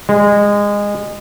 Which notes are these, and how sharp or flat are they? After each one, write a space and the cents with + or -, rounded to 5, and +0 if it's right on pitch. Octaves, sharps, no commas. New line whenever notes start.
G#3 -20